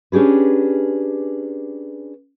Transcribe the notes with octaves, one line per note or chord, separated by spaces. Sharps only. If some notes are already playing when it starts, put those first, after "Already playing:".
C#4 D4 G4 G#4 B4